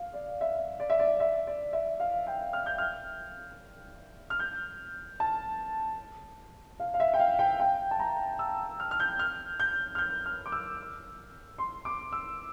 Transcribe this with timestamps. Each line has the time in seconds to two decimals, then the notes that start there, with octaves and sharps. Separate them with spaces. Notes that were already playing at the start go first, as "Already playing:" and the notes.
Already playing: F5
0.13 D5
0.41 E5
0.80 D5
0.90 E5
0.99 D5
1.20 E5
1.47 D5
1.73 E5
2.00 F5
2.27 G5
2.53 F6
2.66 G6
2.78 F6
4.30 F6
4.39 G6
5.20 A5
6.80 F5
6.94 F5
7.00 E5
7.14 G5
7.20 F5
7.39 G5
7.60 G5
7.91 A5
8.00 A#5
8.39 E6
8.80 F6
8.91 F6
9.00 G6
9.19 F6
9.60 G6
9.95 F6
9.98 G6
10.26 F6
10.46 D6
10.52 E6
11.58 C6
11.85 D6
12.12 E6